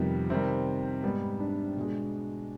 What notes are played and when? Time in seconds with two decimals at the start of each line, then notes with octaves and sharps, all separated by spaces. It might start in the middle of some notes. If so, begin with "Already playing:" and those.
Already playing: F2 C3 D#3 G3 B3
0.30 C3 D#3 G3 C4
1.03 G#2 G3 B3
1.40 D4
1.76 B2 G#3